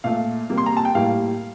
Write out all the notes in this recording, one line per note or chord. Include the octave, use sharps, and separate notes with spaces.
A#2 A3 F5
C3 G3 A#3
C6
A#5
A5
G5
A2 G3 A#3 F5